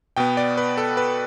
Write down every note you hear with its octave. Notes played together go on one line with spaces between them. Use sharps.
B2 B3 G5
D5
B4
A4
B4